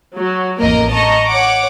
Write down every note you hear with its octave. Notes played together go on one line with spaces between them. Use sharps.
F#3
A1 F2 A#3 A#4 D#5
D#5 A5 A#5 C#6
C#5 F#5 D6